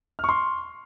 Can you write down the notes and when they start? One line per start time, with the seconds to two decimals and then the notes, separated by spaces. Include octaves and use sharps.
0.19 F6
0.24 C#6
0.29 C6